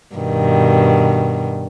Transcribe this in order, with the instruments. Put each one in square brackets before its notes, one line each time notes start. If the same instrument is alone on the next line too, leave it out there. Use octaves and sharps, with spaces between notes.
[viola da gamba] G2 B2 D#3